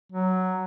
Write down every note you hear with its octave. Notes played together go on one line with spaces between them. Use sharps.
F#3